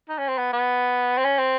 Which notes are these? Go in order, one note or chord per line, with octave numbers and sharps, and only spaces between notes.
D#4
C#4
C4
B3
B3
C4
C#4
C4